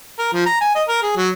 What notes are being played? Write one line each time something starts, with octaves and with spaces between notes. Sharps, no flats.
A#4
F3
A#5
G#5
D#5
A#4
G#4
F#3